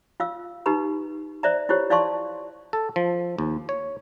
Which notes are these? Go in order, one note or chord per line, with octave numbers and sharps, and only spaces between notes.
F4 F5 E6
D#4 G4 B4 A#5 B5
C5 D5 E5 A#5
E4 F4 G4 C5 C#5
E4 D5 F5 A5 C6 C#6
A4
F3
D#2
C#5